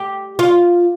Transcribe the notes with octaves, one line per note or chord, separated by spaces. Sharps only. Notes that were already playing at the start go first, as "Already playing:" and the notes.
Already playing: G4
F4